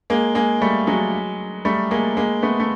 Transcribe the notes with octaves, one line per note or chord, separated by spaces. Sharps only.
G#3 A#3
G#3 A#3
G3 A3
F#3 G#3
G3 A3
G#3 A#3
G#3 A#3
A3 B3
A3